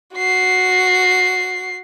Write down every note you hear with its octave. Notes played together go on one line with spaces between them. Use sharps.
F#4 C7